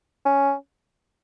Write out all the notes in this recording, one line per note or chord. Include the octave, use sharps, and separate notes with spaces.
C#4